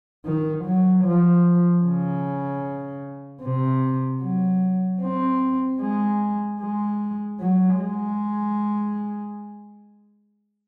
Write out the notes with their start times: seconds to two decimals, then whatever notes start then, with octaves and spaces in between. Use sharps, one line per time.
0.25 D#3
0.65 F#3
1.04 F3
1.84 C#3
3.42 C3
4.21 F#3
5.01 C4
5.80 G#3
6.60 G#3
7.40 F#3
7.79 G#3